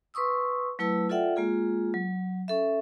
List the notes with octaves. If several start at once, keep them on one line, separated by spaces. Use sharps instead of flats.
B4 C6 C#6 D#6 E6
F#3 A3 E4 B4 A5 E6
F4 A4 D5 E5 F#5 G5
G#3 A#3 F4 G#4
F#3
C#4 A4 E5